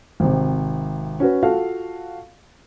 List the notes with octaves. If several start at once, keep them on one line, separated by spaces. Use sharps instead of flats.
G#1 C3
C#4 F#4 B4
F4 F#4 A4 F5